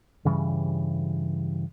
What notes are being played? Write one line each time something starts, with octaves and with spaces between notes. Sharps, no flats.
G2 C#3 E3 G3